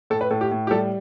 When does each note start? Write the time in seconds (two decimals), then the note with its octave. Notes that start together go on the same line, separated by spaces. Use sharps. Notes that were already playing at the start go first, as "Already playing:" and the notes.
0.10 A2 A4
0.21 B4
0.30 A2 A4
0.41 G4
0.51 A2
0.67 G4
0.71 G3 A4